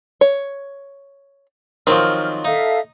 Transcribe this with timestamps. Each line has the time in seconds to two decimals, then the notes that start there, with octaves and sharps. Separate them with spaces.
0.21 C#5
1.87 D#3 F3 F#3 C4 F6
2.45 D#4 A4 E5 F5